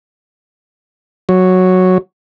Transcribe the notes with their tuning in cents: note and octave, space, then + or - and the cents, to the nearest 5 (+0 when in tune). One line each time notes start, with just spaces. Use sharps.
F#3 -5